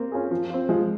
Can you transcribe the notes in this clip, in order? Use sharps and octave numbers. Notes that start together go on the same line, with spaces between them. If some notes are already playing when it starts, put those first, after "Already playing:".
Already playing: A#3 C4
C#4 F4 G#4
F3
C4 F4
F3 G#3